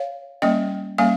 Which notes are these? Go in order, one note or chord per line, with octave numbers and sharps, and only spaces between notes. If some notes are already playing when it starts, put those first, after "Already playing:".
Already playing: C#5 F5
G3 A#3 C#4 D#5 G5
G3 A#3 C#4 F5 G#5